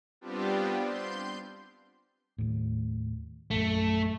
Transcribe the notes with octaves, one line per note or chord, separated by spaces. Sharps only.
G3 B3 C4 D4 F4 G4
C6 G6
D#2 A2
A#1 F#2 A3